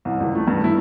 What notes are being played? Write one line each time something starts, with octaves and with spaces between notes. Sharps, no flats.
C2
C#2
A3
G2
E4